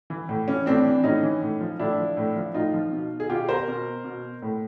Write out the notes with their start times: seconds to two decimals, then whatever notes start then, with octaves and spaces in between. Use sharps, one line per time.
0.10 E3
0.29 A2
0.48 E3 C#4
0.66 A2 C4 D4
0.85 E3
1.04 A2 C#4 D#4
1.23 E3
1.42 A2
1.61 F3
1.79 A2 D4 E4
1.98 F3
2.17 A2
2.36 F3
2.54 A2 D#4 F4
2.74 F3
2.92 B2
3.20 G#4
3.29 B2 F4 G4
3.49 A#4 C5
3.68 B2
4.05 B2
4.42 A2